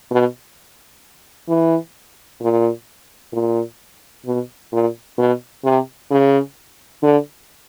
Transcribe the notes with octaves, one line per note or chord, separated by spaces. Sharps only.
B2
E3
A#2
A#2
B2
A#2
B2
C3
C#3
D3